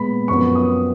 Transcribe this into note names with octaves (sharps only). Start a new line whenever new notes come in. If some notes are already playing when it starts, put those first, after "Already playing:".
Already playing: A#2 G#3 B3 B5
F#2 F3 B3 C#6
D#6